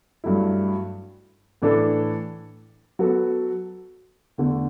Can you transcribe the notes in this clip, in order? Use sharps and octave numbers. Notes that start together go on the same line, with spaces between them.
G2 F#3 A3 E4
A2 E3 A3 D4 A4
F#3 B3 F#4 A4
E2 D3 A3